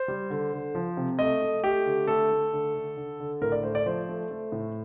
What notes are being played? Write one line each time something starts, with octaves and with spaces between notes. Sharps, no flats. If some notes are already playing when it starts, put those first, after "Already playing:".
Already playing: C5
G3
D3
D3
F3
C3
A3 D#5
A3
A3 G4
D3
A3 A4
A3
D3
D3
D3
D3
A2 A#4
D5
A3 C5
D5
F3 C5
A3
A3
A2